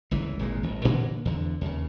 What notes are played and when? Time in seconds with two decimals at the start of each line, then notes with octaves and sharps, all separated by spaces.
0.11 G1 C#2 E3
0.39 G#1 A#2 D#3 G#3
0.63 G#1
0.84 G2 A#2 D3 E3
1.25 E2 D3
1.61 D#2 C#3